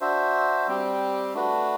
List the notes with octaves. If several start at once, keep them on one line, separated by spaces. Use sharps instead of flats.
D4 F#4 C5 E5
G3 C4 G4
A3 D4 F#4 B4